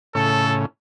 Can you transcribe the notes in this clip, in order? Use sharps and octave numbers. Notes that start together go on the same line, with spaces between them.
A2 C#3 A4